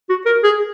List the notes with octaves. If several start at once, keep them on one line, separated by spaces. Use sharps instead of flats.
F#4
A#4
G#4